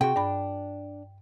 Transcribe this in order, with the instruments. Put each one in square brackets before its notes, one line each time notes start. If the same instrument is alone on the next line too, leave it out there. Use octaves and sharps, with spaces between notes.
[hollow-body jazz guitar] C3 F#4 [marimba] G#4 [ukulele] G5
[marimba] G2 B5 [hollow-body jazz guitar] D4